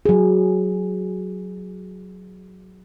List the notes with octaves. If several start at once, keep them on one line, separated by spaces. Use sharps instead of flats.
F#3 G#4